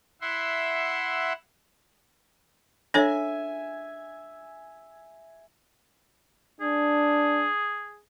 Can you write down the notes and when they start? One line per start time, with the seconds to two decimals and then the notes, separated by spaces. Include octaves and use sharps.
0.21 E4 E5 F#5 C6
2.94 D4 A4 C#5 E5 G#5
6.61 D4 G#4